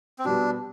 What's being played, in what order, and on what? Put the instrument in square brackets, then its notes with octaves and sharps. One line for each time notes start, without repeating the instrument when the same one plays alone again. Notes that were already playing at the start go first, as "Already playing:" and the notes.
[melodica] C4
[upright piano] B2 G3 B3 [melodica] D4